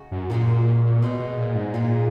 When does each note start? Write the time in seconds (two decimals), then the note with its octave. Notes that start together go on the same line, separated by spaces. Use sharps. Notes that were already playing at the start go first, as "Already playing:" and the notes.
Already playing: C#3 D#4 F#4
0.12 F#2
0.30 A#2 C#3 G#3 D#4 F#4
1.02 B2 G#3 D#4 G#4
1.20 B2
1.37 A#2
1.55 G#2
1.74 A#2 G#3 D#4 G#4